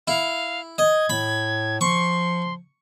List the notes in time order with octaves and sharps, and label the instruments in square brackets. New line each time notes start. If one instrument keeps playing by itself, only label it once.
[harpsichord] E4 [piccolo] F5
[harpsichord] D#5 [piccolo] G#6
[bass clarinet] A2 [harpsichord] B5
[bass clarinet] F3 [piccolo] C6 [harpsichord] C#6